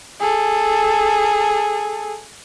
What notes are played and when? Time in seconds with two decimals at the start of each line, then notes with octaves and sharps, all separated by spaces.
0.21 G#4 A4